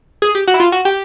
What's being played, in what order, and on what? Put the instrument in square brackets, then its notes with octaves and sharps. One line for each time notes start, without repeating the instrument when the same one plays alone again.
[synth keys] G#4
G4
F#4
E4
F4
F#4
G4